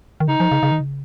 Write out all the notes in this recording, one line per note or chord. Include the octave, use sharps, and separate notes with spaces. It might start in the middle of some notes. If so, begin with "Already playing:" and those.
D#3
C#3 D#4
F3
C#3
C#3
D#3
C#3